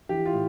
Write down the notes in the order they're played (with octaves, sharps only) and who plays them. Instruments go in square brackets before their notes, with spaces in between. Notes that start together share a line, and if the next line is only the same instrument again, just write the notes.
[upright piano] E3 G4
F4
A2